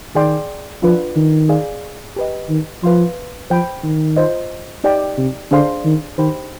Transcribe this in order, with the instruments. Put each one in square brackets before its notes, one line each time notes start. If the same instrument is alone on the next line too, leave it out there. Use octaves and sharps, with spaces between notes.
[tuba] D#3 [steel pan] G#4 D5 G5 C6
[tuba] F3 [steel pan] D4 F4 B4
[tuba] D#3
[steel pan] G#4 D5 F5
G4 B4 D#5
[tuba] D#3
[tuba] F3 [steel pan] B4 F5 C6
[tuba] F3 [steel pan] C5 G5 B5
[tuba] D#3
[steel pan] F4 C5 D#5
D#4 G4 D5 G5
[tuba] C3
[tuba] D3 [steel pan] D4 G#4 C5 F5 C6
[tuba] D#3
[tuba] D#3 [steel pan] D#4 G4 C5 G5 B5